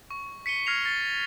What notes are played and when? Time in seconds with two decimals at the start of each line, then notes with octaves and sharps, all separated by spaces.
0.10 C#6
0.46 B6 C#7 D#7 G7
0.67 F6 G#6 A#6 C7 F7
0.85 A6